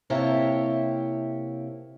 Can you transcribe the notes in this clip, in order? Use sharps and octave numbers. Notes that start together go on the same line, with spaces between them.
C3 A#3 E4 G4 C#5 A5